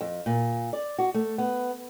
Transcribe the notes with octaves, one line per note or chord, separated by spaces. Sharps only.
F2
A#2
D5
F#4
A3
B3